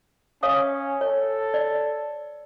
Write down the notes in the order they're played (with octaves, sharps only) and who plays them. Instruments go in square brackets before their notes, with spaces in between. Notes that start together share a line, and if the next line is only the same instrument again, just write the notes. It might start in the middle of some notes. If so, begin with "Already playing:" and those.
[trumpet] C#4 [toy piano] C#5 F5 D#6
[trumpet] A4 [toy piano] C#5
[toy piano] D5